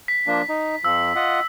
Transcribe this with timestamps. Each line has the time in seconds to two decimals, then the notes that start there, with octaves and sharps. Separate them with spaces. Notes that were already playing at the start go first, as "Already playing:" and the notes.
0.08 B6
0.27 F3 A#3 D4
0.49 D#4
0.84 F2 F3 E6
1.16 F4 D#5 F#5